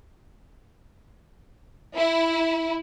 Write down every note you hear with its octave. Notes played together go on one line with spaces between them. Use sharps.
E4